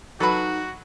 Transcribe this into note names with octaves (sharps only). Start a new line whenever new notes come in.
F#3 D#4 F#4 A4 B4 B5